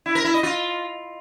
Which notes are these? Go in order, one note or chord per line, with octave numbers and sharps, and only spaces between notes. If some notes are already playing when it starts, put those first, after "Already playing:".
E4
A#4
E4
D#5
F4